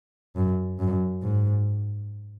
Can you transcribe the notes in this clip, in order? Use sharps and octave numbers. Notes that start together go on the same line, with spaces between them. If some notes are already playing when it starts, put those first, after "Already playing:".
F#2
F#2
G#2